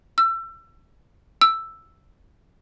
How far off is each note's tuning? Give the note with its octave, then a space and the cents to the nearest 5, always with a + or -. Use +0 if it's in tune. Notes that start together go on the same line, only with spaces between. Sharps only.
E6 +30
E6 +5